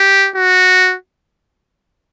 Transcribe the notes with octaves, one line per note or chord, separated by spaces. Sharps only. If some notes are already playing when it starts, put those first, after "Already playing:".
Already playing: G4
F#4